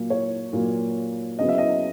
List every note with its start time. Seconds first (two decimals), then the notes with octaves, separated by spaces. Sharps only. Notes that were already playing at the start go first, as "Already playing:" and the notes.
Already playing: A#2 F#3 A#3
0.10 C#5
0.53 A#2 F#3 A#3
1.39 C#3 F#3 B3 D#5
1.49 E5
1.58 D#5